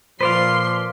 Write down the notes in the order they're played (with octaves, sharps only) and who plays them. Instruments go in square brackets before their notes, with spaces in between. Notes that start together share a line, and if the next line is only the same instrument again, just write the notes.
[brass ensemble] A#2 F3 [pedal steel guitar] B4 D5 F5 [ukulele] C5 [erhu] C6